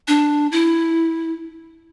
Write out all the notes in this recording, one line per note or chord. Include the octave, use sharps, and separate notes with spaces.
D4
E4